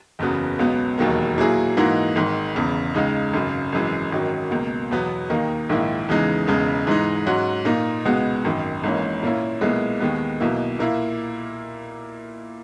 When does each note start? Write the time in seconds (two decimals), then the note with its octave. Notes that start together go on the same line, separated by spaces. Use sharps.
0.19 F#1 E2 C#3 F#3 B3
0.59 C#2 B2 F#3 B3
0.98 E1 D#2 D#3 F#3 A#3
1.38 A#2 F#3 A#3 E4 G#4
1.77 G#2 E3 A#3 D#4 F#4
2.15 G#1 G#2 D#3
2.55 E1 E2 C#3
2.94 C#2 C#3 G#3 D#4
3.33 G#1 F#2 C#3
3.72 G#1 F#2 E3 G#3
4.12 G#1 F#2 D#3 F#3
4.51 C#2 B2 A#3
4.91 E2 B2 F#3 B3
5.30 D#2 D#3 A#3 D#4
5.69 A#1 G#2 D#3 A#3 E4
6.09 E2 C#3 E3 G#3 D#4
6.47 E1 E2 C#3 G#3
6.87 G#2 E3 G#3 D#4
7.26 G#2 F#3 C#4 F#4
7.65 A#2 A#3 D#4
8.05 C#2 B2 G#3 B3 F#4
8.44 G#1 F#2 D#3
8.83 G#1 G#2 E3 A#3 C#4
9.23 A#2 A#3 C#4 E4
9.61 B1 A#2 G#3 B3 E4
10.00 D#2 D#3 G#3 B3
10.40 B1 B2 A#3 E4
10.79 A#2 A#3 E4